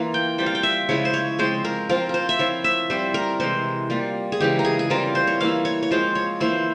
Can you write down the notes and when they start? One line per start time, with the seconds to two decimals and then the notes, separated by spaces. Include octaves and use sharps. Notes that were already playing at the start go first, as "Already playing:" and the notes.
Already playing: E3 A#3 F4
0.14 G5
0.38 G3 C4 F4 G5
0.46 F5
0.55 G5
0.63 E5
0.89 C#3 F3 G#3 E4 C#5
1.05 C5
1.14 C#5
1.39 F3 G#3 C4 C5
1.65 A#4
1.89 F3 C4 F4 A#4
2.09 A#4 C5
2.29 E5
2.39 F3 C4 E4 C#5
2.64 E5
2.90 G3 C4 E4 C5
3.14 A#4
3.40 C3 E3 G#3 C5
3.90 G3 A#3 F4
4.32 G#4
4.40 C#3 E3 G#3 G4
4.59 A#4
4.65 G#4
4.79 G#4
4.90 E3 G3 C4 F4 A#4
5.15 C5
5.27 C#5
5.41 E3 A#3 E4 F5
5.65 C#5
5.83 C#5
5.91 F3 G#3 C4 F4 C5
6.15 C#5
6.40 E3 A#3 E4 C5